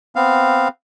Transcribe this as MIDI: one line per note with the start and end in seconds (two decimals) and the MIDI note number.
0.16 0.68 59
0.16 0.68 60
0.16 0.68 77